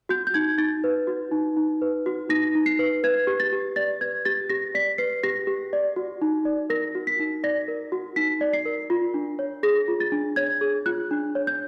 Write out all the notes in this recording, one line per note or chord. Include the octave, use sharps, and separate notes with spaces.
F#4 G6
G6
D#4 G#6
D#4 A6
B4
F#4
D#4
D#4
B4
F#4
D#4 A#6
D#4
C7
B4
B4 G#6
G4
A6
G4
D5 A6
B4 G#6
G4 A6
G4 A#6
D5 B6
B4 C7
G4 A#6
G4
D5
F#4
D#4
D5
A#4 A#6
F#4
B6
D#4
D5 A#6
A#4
F#4
D#4 B6
D5
C7
A#4
F4
D4
C#5
G#4 A#6
F4
A6
D4
C#5 G#6
G#4
F4 F#6
D4
C#5
G6